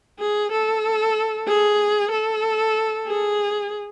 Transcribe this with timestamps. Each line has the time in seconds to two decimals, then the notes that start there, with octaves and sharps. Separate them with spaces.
0.19 G#4
0.52 A4
1.47 G#4
2.12 A4
3.07 G#4